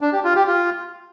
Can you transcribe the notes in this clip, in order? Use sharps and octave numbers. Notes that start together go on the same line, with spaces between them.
D4
G4
F4
G4
F4